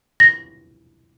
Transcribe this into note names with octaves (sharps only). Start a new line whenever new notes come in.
A#6